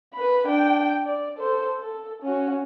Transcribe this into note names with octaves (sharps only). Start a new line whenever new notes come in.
B4 B5
D4 G5
D5
A4 C5
A4
C#4 F#4